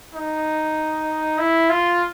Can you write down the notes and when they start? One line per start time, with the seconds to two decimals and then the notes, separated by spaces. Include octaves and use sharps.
0.15 D#4
1.38 E4
1.70 F4